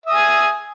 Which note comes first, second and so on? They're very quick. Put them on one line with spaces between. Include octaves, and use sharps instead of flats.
E5 D#6 G#5